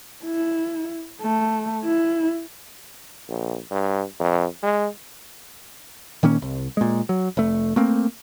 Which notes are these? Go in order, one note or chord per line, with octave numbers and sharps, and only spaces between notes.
E4
A3
E4
A#1
G2
F2
G#3
A#2 D#3 A#3 C#4
C2
A#2 G#3
F#3
F1 A3
A3 A#3 C4